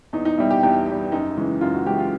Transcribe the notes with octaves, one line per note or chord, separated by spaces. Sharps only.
E2 D#4
D#4
B2 G3 E4
G4
E2 G4
B2 G3
F#2 D#4
C#3 E3 G#3
F#2 F4
F#4
C#3 E3 G#3 G4
F4